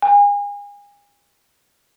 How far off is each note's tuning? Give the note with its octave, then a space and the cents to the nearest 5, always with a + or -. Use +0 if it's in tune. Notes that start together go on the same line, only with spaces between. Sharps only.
G#5 -35